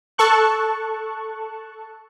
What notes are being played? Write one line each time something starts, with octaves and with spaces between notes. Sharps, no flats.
A4 A5 C#6 F#6